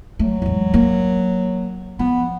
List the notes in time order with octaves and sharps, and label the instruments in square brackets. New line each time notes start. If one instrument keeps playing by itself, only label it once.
[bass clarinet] F#3 [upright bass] A3
[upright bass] E2 G#2
A#3
[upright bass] F3 [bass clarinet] B3